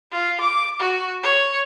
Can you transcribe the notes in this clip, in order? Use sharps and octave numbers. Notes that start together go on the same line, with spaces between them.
F4
D6
F#4
C#5